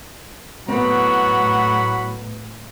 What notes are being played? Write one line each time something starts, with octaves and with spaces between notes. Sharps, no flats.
A2 F#3 B3 C4 F#5 B5